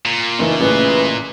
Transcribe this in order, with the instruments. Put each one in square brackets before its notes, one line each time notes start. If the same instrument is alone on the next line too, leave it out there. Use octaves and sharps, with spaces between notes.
[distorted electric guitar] A#2
[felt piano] F#1 E3 D#4
[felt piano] A1 C#3 E3 [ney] B4